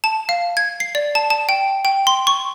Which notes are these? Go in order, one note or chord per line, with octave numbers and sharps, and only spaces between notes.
A5
F5
G#6
C7
D5
A5
A5
G5
G5
C6
C#6